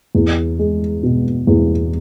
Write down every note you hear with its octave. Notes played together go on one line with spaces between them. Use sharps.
E2
G#3
B2
E2